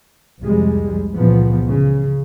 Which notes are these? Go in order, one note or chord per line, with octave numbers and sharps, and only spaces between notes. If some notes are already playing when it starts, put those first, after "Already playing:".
C2 F2 G3 G#3
C#2 A#2 E3 F3 B3
C#3